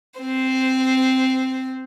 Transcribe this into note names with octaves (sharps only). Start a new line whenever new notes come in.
C4 C5